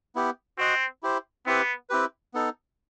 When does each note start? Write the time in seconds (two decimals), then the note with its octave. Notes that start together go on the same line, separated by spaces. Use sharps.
0.15 B3 E4 G4
0.58 C4 F#4 C5 D#5 F#5
1.03 E4 G4 C5
1.46 B3 C4 E4 G4 B4
1.90 C4 E4 G4 B4
2.34 B3 D#4 A4